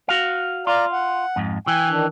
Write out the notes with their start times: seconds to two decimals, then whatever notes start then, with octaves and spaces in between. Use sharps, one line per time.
0.09 F#4 F5
0.67 F4 D5 F5 A#5
0.93 F#5
1.36 F2 G#2
1.67 E3 G5 G#5
1.89 D#3 D4